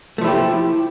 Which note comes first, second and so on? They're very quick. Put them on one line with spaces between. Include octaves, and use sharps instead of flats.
A3 F3 E4 G4